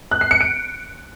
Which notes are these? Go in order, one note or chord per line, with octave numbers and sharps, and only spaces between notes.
F#6
C7
C#7
D7